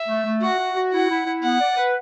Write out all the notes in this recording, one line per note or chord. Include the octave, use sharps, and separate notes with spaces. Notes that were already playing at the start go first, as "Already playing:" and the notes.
Already playing: E5
A3
A3
F#4 F#5
F#4
F#4
E4 F#5
E4
E4
B3 F#5
D5
B4